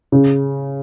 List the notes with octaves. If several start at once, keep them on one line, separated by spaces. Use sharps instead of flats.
C#3